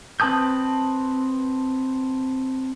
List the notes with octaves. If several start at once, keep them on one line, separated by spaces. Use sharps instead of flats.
C4 B4 A5 D#6 G6